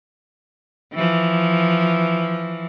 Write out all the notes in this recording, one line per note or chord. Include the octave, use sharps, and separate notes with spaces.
E3 F3